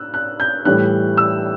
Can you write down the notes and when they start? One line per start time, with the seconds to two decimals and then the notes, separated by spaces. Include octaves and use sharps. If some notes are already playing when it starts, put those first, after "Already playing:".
Already playing: E6 F#6
0.14 F#6
0.40 G6
0.65 A2 E3 G3 F#6
1.17 E6